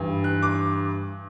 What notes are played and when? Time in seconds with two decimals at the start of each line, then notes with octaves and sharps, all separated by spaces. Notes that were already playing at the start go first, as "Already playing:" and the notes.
Already playing: G2 E3
0.24 F#6
0.43 D6